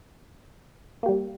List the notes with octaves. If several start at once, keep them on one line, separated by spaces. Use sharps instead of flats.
G3 A#3 G4